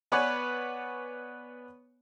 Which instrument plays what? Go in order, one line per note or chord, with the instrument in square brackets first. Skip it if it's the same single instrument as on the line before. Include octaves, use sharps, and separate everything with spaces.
[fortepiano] B3 B4 C#5 D5 F#5 G#5